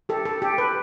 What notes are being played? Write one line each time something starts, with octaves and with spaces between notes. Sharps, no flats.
G4 A4
A4
G4
B4